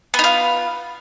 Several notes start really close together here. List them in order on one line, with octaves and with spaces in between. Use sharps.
B3 D#4 F4